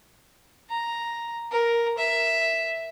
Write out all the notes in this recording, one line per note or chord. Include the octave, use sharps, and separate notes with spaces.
A#5
A#4
E5